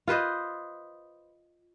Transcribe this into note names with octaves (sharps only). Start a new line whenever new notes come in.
F4 B4 C5 D#5